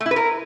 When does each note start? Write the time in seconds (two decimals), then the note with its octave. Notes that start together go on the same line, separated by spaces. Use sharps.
0.01 A3
0.06 E4
0.11 B4
0.16 A#4